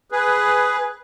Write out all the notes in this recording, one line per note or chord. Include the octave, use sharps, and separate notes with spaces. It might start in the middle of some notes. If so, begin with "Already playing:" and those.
G#4 B4